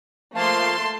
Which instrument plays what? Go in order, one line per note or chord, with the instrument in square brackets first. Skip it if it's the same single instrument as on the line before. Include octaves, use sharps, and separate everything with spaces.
[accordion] F3 A#3 F5 [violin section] A3 C6 [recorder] A5